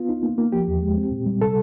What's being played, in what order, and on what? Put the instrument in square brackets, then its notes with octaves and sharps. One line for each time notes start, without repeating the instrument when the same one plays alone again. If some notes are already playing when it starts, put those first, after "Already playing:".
Already playing: [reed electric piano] B3 F4
D#4
A#3
A#3
F3 G4
E2
G#3
C4
A#2
G3
C3 A4